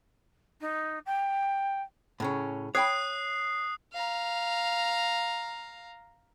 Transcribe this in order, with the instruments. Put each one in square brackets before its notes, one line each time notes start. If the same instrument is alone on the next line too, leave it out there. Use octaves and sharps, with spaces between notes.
[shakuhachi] D#4
G5
[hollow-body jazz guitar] A2 C#3 C#4
[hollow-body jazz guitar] C#5 G5 B5 [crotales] D#6 F#6 C7
[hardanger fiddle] F5 A#5